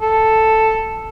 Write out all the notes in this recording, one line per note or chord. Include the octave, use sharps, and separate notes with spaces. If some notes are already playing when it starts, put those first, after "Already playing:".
A4